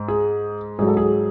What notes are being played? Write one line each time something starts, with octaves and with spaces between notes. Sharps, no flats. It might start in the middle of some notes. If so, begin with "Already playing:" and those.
Already playing: G#2
G#4
G#2 F#3 G#4
A4
G#4